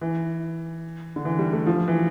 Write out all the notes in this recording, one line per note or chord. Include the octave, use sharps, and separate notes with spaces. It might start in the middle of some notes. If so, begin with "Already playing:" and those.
E3
D3
E3
G3
A3
F3
E3